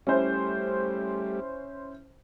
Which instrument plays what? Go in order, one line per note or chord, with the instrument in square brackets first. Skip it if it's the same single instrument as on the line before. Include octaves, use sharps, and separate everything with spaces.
[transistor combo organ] G3 A3 G4 [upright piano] C#4 E4 C5